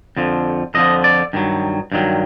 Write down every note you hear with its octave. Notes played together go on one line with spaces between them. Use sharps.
F2 D3 F3
F2 D3 F3 D#5
D5
G2 D#3 F#3
G2 D#3 F#3